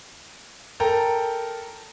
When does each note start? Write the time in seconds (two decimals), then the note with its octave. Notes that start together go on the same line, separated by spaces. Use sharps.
0.80 A4 A#4 G5 A#5